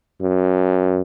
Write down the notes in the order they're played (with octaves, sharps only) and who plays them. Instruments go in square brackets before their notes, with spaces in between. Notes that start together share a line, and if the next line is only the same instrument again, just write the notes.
[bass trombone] F#2